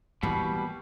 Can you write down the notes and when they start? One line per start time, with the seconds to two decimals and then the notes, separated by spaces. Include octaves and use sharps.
0.23 B2 E3 G3 A#3